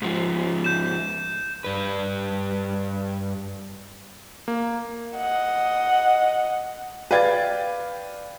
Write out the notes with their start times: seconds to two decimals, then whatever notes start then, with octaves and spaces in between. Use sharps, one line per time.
0.02 G#2 F3
0.64 G6 E7
1.64 G2 B4
4.48 A#3
5.17 D#5 F#5
7.11 B4 D5 F5 G5 G#6 A6